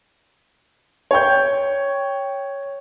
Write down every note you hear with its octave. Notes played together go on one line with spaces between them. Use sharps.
C#5 G5 G6